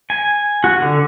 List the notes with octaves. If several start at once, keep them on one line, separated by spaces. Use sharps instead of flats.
G#5
F#4
D3